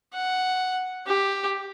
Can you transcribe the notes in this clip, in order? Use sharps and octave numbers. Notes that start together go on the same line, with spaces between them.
F#5
G4